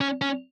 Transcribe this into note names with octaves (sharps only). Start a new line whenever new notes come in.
C#4
C#4